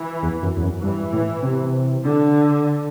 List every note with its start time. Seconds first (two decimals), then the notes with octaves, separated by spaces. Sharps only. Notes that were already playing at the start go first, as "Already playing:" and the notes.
Already playing: E3
0.22 E2
0.42 F#2
0.56 E2
0.62 F#2
0.82 G2 E3
1.13 A2
1.42 C3
2.03 D3